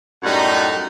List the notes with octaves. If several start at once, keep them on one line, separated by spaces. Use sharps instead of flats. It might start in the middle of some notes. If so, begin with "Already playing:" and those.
F#2 A2 G3 D#4 F#5